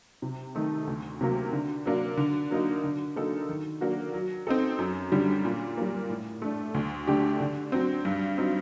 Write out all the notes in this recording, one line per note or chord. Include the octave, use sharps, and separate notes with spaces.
C3
D#3 A3 D#4
D2
C3 F#3 A#3
D3
F#3 A#3 D4
D3
F#3 A#3 D#4
D3
F#3 A#3 D#4 A4
D#3
F#3 A#3 D4 F#4
F#3
C4 D#4 A4
F#2
D3 G3
A#2
G3 A#3
A2
A3 D4
D2
D3 A3 D4 G4
D3
F#3 C4
G2
F#3 C4 D#4